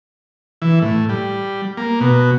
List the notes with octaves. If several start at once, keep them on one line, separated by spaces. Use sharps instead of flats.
E3
A2
G3
A#3
B2